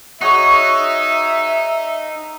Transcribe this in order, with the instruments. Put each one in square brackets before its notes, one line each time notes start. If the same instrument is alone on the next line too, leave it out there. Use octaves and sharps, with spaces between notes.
[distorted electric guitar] D#4 [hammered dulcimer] F#4 G#4 C#5 [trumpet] E5